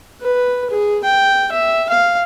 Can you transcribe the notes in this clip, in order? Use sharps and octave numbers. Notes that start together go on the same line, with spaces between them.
B4
G#4
G5
E5
F5